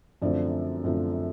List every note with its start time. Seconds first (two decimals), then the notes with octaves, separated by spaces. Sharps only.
0.22 F#2 D3 F3 A3 C4 D5
0.84 F#2 D3 F3 A3 C4